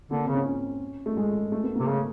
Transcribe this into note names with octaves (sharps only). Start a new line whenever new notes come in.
D3 A#3
C4
C#3
C#4
C#4
A3
G#3
A3
B3
C3 A#3
C#3 A3